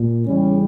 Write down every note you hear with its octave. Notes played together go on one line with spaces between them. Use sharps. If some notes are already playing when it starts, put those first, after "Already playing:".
Already playing: A#2
E2 C#3 G3 C#4